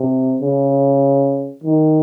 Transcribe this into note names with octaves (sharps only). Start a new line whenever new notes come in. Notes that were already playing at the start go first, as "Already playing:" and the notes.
Already playing: C3
C#3
D#3